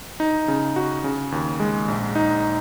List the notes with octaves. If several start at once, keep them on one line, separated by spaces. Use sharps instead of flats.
D#4
C#3
F#4
C#3
D#2
G#3
A#1
D#4